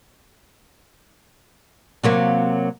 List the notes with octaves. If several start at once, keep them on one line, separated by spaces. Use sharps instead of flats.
C3 F#3 A#3